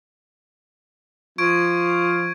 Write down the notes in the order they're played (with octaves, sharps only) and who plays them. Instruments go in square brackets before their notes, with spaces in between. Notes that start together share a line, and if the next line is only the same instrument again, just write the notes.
[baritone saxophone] F3 [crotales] C#6 G#6 D7